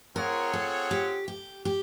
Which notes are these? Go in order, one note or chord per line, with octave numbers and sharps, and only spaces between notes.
C4 F4 G#4 A#4 C#5 F#5
A4
G4
G4
G4